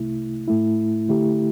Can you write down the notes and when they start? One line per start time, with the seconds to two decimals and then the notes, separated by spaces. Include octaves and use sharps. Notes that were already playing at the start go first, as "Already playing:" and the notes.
Already playing: C2 C3 A3 E4
0.48 A2 A3 E4
1.09 D3 A3 E4 G4